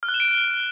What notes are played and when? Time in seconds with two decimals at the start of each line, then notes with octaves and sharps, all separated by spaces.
0.03 F6
0.09 F#6
0.14 E7
0.20 D7